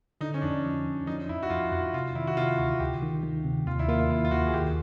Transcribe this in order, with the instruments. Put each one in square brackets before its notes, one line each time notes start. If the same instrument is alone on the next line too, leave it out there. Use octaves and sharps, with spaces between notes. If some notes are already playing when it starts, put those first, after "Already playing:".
[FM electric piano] D3 [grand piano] D#4
[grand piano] C#4
[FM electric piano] F2 [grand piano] D4
[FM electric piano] F3
F2
[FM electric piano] F3 [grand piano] D#4
[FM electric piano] F2 [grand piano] E4
[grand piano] F#4
[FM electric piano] F2 [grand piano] F4
[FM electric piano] F2 [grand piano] F#4
[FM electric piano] C3 [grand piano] F4
[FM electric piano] D#3 [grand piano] E4
[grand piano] F#4
[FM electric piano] C3 [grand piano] F4
[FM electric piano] D2 [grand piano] F#4
[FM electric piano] D2 [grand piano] G4
[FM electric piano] D#3
D#3
C3
[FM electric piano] D#2 [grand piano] F4
[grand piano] E4
[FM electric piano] A#3 [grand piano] F4
[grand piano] E4
[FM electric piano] D#2 [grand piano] F4
[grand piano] F4
[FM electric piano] D#2 [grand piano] F#4
[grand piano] G#4
[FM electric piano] D#2 [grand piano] G4